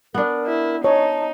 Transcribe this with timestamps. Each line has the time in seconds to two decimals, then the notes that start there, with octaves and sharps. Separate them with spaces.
0.14 B3 D4 A#4
0.47 E4
0.84 D#4 C#5 A5